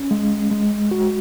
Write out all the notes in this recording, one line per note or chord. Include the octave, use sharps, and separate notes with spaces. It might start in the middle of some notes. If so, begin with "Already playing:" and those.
Already playing: C#4
G#3
G#3
F#4